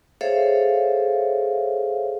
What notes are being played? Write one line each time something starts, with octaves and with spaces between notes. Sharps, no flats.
G#4 A4 C5 C#5 E5 F5